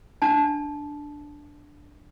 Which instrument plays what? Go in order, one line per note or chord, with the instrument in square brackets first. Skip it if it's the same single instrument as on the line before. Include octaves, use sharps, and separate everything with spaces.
[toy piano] D4 A5